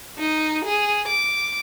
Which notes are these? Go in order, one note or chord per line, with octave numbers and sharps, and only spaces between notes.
D#4
G#4
D6